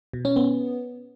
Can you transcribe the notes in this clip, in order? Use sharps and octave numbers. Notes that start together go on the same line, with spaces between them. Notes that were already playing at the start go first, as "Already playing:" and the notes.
B2
C#4
B3